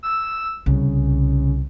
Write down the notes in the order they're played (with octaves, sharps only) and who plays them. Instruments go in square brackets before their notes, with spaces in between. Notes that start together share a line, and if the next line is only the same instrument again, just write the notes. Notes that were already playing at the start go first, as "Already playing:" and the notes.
[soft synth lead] E6
[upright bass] C2 [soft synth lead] C#3